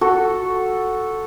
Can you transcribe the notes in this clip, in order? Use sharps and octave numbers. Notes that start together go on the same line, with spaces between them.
F#4 A4